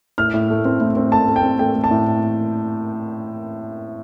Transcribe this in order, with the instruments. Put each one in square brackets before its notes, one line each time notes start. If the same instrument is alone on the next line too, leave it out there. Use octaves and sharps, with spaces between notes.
[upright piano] A2 F6
A2
A3
C4
A2
C4
A3 A5
A3
G5
C4
A3 G5
A3
A5
A2